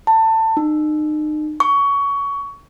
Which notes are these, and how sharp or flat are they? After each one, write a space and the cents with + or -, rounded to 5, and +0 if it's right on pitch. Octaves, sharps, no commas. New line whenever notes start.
A5 +20
D#4 -35
C#6 +20